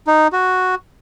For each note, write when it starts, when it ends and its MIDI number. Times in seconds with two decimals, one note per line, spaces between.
0.07 0.28 63
0.33 0.75 66